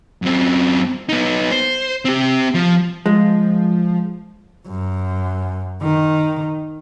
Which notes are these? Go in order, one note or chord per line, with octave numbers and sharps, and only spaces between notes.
F#2 C4
B3 D#4
C5
C4 G4
F3
F3 G#3
F#2
D#3